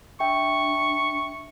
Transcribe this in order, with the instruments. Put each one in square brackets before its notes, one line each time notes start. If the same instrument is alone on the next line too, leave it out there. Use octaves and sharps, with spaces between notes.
[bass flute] D4 [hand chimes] E5 G5 [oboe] C#6